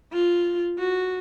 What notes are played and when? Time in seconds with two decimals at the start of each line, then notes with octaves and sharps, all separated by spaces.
0.12 F4
0.79 F#4